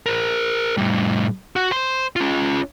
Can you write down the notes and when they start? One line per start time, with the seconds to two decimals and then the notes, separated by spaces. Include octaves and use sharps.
0.06 A#4 C5
0.78 A2 G3
1.56 F#4
1.71 C5 C6
2.16 C#4 F4